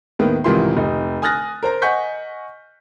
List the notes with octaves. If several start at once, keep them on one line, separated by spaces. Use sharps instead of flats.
D#2 A2 D#3 B3
C2 G#2 D#3 E3 F4 C6
F1 D#4
G#5 D#6 F6 F#6 A6 A#6
A#4 C5 A#5
D#5 F#5 G#5 C#6 G6 B6